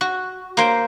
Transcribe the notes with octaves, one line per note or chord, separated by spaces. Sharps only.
F#4
A#3 C5 G5